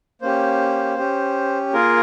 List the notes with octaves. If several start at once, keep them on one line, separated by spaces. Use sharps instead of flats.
A#3 C#4 G4 C5
C#4 G4
A#3 F4 G#4 A#4